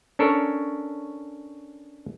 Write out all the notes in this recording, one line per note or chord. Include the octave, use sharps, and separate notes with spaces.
C#4 D4 A4 A#4 C#5